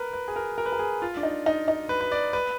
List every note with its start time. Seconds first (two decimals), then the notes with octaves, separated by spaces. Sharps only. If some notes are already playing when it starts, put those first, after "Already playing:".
Already playing: A#4 B4
0.13 B4
0.28 G#4
0.36 A#4
0.58 A#4
0.66 B4
0.73 A#4
0.79 G#4
1.02 F4
1.17 D4
1.23 D#4
1.46 D#4
1.68 D#4
1.89 B4
2.01 B4
2.12 D5
2.33 B4